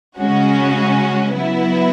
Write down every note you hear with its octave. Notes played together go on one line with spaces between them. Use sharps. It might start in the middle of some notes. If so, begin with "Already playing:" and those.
C#3 G#3 C#4 F#4
F#3 B3 E4